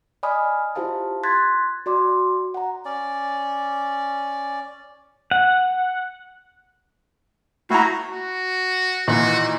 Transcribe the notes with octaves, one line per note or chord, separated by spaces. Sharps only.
D5 D#5 G#5 B5 D#6 F6
E4 F4 G4 C5 F5 A5
C6 F#6 G#6 A6 B6
F#4 D5 C6 D6
F#5 A#5
C#4 D5
F#5
A2 E4 F#4 A#5
F#4
A#2 D#3 E3 F#4